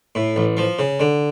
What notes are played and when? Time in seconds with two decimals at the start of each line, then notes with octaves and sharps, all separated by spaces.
0.15 A2
0.36 A1
0.57 F3
0.79 C#3
1.00 D3